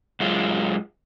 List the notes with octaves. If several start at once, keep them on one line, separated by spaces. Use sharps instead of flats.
F#2 G#3 F4